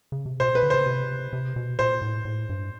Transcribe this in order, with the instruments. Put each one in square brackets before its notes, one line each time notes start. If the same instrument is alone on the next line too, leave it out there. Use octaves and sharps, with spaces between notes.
[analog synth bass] C#3
C3
[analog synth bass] B2 [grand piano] C5
[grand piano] B4
[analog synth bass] D3
[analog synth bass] C#3 [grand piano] C5
[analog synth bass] C3
C3
B2
[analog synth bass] A#2 [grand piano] C5
[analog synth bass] A2
A2
G2